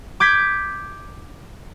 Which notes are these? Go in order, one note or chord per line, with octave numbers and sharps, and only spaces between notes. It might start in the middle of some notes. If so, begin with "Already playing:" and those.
D6 G6 G#6 B6